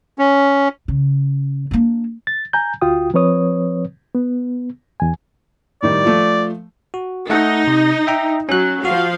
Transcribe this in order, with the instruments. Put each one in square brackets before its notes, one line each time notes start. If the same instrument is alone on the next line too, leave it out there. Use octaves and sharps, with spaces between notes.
[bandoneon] C#4
[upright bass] C#3
A#3 D4
[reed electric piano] A6
G#5 A#5 G6
D2 F4 F#4 G5 D#6
F3 C4 B4 C#5 D#6
B3
E2 G#5
[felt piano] A2 D#3 G3 [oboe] D5
[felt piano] F3 A3
[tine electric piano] F#4
[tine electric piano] A3 A4 F#5 [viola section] D#4
[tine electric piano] C3
E5 G5 A#5
[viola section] F#3 [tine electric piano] C#4 F#6
[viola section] F3 F5 [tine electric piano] F#4